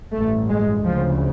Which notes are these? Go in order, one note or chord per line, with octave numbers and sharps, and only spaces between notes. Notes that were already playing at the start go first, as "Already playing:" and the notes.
A1 G2 A3
G#3
D2 C#3 F3